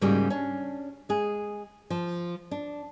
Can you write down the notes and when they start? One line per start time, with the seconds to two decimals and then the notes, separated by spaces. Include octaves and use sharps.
0.01 G#2 C#3 G3 A#3 F#4 G#4
0.30 C#4 D4
1.09 G#3 G#4
1.90 F3
2.51 D4